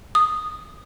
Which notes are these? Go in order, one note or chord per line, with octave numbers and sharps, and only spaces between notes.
D#6